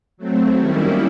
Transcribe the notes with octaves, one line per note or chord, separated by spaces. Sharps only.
F#3 A3 C4
D#3 G3 A#3 C#4 E4